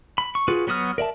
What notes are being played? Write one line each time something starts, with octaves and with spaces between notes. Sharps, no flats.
B5
C#6
F4 F#4 G#4 B4
F#3 B3 F#4 D#6 F6
A#4 D5 E5 A5